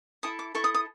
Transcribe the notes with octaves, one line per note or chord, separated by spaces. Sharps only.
E4 A4 D#6
D6
E4 A4 C#6
D#6
D#6